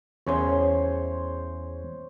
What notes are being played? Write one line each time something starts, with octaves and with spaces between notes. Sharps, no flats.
E2 C#4 G#4 C5 C#5